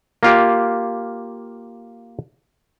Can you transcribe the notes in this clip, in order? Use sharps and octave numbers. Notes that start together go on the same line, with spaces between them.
A#3 F4 G4